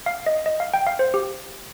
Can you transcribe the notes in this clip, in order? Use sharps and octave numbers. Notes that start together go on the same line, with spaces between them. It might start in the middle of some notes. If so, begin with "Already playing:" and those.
F5
D#5
D#5
F5
G5
F5
C5
G4